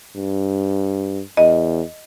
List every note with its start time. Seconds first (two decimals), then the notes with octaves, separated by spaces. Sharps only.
0.15 G2
1.37 E2 D#5